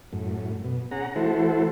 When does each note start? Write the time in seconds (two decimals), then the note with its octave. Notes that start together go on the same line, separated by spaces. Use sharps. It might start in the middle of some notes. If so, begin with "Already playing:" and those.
0.13 F#2 A2
0.64 B2
0.91 C#4 G#4 F#5 A#5
1.16 E3 A3 E4 F#4 A4 C5